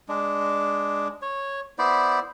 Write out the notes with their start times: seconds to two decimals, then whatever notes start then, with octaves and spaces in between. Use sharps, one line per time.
0.08 G#3 D4
1.22 C#5
1.79 B3 E4 C5 D5